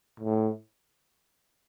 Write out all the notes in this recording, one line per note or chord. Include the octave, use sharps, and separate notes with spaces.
A2